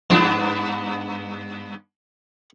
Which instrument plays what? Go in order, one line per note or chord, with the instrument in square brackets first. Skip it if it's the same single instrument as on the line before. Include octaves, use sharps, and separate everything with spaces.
[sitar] G2 B3 D4 [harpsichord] F3 C5 C6